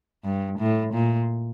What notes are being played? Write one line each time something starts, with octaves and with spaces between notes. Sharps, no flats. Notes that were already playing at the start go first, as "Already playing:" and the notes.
G2
A2
A#2